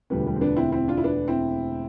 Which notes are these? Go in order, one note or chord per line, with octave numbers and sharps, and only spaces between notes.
E1 D2 D3 F3 G3 B3
G3 B3
C4
B3 D4
C4 E4
C4 E4
D4 F4
E4
B3 D4
C4 E4